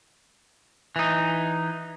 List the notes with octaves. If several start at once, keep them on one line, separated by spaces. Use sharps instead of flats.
E3 D#4